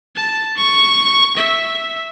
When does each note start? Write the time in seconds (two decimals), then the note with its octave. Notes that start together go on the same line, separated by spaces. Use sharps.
0.16 A5
0.57 C#6
1.37 E5